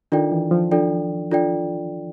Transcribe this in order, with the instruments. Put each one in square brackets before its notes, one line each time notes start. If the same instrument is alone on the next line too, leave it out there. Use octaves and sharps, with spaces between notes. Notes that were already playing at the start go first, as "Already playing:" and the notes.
[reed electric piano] D#3 [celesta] D4 F4 A4 D5 G5
[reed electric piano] E3
F3
[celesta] D4 F4 A4 D5 G5
D4 F4 A4 D5 G5